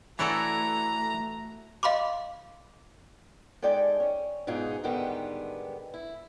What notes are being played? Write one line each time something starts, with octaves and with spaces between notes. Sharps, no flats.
E3 A3 E4 F#4 A4 C#5 D5 A#5
D#5 F5 B5 C6 D6
G#3 D#4 A4 D5 G5 G#5
C#4
G#2 B2 D#4 F4 G#4
G#2 D3 D#3 G3 G#3 B3
E4